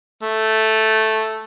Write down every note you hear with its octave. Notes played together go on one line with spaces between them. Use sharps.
A3